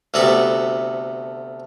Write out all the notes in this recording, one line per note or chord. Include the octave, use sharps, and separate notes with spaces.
D2 C3 A3 B3 F#4 A4